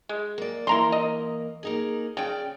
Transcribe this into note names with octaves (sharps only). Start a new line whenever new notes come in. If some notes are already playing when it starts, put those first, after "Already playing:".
G#3
A#3 D5
E3 A#3 E4 A#5 C6
D#5
A#3 D#4 G#4
C#3 D5 G5